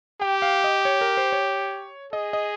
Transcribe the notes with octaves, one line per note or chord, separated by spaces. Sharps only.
G4 G5
F5
D#5
C#5
A#4
C5
C#5
G#4 D#5
D#5